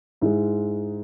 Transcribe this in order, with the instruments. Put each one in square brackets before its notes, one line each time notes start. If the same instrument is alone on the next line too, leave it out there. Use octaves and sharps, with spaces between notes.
[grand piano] G#2 G#3 E4